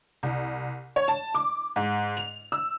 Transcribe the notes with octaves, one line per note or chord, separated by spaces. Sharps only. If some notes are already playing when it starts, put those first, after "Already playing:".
C2
C#5
A5
D6
G#2
F7
E6